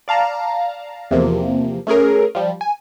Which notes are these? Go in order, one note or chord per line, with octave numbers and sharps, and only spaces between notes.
D5 F5 A5 A#5
E2 C3 F3 A#3
A3 C#4 G#4 A#4
F3 G3
G#5